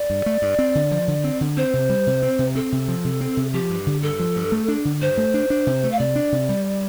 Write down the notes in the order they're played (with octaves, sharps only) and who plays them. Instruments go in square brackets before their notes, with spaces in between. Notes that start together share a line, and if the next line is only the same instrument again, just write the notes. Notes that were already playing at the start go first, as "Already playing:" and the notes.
Already playing: [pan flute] D5
[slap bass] G2
A3
G2
C4
D3
F3
D3
C4
D3
[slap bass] C4 [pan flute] C5
[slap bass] C3
G3
C3
C4
C3
[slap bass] C4 [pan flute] A4
[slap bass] C3
F3
C3
C4
C3
[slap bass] F3 [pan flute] G4
[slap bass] G2
D3
[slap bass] G2 [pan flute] A4
[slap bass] F3
G2
A3
D4
D3
[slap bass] G2 [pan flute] C5
[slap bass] A3
D4
D4
C3
A3
[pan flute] F5
[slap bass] C3 [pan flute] D5
[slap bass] D4
C3
G3